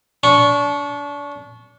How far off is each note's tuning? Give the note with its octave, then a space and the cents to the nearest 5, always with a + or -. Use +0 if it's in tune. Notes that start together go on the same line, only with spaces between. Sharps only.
D4 -30 C#6 +0